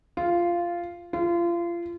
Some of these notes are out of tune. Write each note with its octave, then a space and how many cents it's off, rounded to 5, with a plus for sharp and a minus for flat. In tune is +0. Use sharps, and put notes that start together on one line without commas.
F4 -10
F4 -30